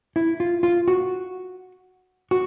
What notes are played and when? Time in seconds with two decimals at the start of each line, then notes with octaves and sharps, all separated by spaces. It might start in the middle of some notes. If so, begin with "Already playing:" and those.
0.16 E4
0.40 F4
0.63 F4
0.88 F#4
2.31 F#4